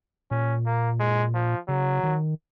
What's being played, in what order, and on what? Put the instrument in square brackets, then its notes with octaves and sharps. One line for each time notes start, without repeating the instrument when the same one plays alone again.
[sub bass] A#2 [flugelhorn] C#4
[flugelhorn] A#3
G#3
F3
[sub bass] C#3 [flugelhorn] F#3
[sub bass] D#3